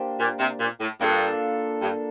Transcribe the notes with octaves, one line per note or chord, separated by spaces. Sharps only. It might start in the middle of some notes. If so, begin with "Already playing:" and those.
Already playing: A#3 D4 G4 C5
A#2
C3
A#2
A2
G2 A#3 D4 F4 A4
G2